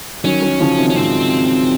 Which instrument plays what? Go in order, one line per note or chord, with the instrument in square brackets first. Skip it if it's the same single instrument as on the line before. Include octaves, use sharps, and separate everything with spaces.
[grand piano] D#3 F#3 [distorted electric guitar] C#4
[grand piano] D#3 F#3
C#3 F3
C3 D#3
[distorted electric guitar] C#4
[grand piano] G#2 C3 [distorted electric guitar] C4